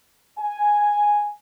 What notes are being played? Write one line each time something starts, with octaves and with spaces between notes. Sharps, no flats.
G#5